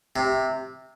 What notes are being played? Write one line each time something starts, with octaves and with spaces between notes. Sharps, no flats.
C3